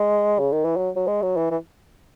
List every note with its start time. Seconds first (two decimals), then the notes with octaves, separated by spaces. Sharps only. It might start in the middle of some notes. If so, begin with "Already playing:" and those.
Already playing: G#3
0.39 C#3
0.52 D#3
0.65 E3
0.77 F#3
0.96 F#3
1.07 G#3
1.22 F#3
1.37 E3
1.51 E3